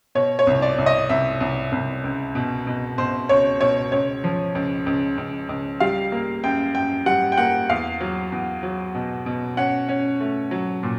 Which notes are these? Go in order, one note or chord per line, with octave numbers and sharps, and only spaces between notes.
B2 C#5
C#5
C2
D5
C2
D#5
C2 E5
C2
C2
C#2
B2
B2
B2 C5
C#2 C#5
B2 C#5
C#2 C#5
F3
C#2
C#2
C#2
C#2
G3 F5
A#3
F#2 G5
F#2 G5
G3 F#5
G5
A#3 F#5
E2 F5
F#3
E2
F#3
B2
B2
C#4 F#5
C#4
A3
F#3
A#2